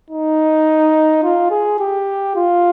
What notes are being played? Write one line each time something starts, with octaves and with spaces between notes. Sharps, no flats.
D#4
F4
G#4
G4
F4